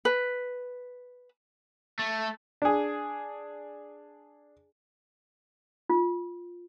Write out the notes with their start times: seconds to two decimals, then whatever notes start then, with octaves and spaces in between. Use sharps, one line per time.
0.05 B4
1.99 A3
2.62 D4 G#4
5.89 F4